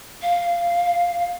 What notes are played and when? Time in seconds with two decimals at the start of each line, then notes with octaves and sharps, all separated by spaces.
0.22 F5